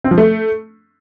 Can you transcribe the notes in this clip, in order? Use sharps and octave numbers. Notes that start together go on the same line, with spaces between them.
C4
F3
A3